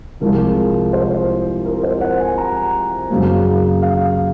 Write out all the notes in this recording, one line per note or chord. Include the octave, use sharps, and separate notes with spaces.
C2 C3 F3 G#3 A#4
C5
A#4
C5
F#5
G#5
A#5
F#2 C#3 F#3 A#3
F5